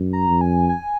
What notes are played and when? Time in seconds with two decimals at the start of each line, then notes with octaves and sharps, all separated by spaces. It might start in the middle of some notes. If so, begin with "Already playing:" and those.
Already playing: F#2
0.13 A#5
0.27 F2
0.41 G#5
0.69 G#5